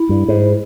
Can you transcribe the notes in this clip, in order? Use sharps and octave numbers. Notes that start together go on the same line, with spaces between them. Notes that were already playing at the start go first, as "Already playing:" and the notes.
Already playing: E4
G2
G#2